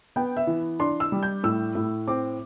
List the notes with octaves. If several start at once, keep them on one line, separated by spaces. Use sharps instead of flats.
B3 G5
E5
E3
D4 C6
E6
G3
G6
A2 E6
A2
C4 D6